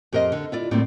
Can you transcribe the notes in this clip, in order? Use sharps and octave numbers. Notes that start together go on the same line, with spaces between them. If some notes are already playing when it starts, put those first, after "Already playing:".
F2 G4 A#4 C5 D#5
D3
E4 F4 D5
D2 A2 G3 A#3 C4 D5